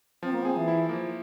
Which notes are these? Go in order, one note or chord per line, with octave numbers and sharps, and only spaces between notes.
F3 C4
A#3
C4 G#4
E3
E4
F3 A#3